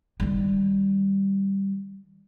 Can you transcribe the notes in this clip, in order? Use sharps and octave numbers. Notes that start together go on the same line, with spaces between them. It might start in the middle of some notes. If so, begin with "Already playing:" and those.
D#3 G3